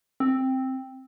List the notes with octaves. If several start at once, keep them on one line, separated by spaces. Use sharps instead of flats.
C4